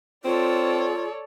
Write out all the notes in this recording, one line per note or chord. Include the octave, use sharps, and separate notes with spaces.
C4 F4 A4 C#5 D5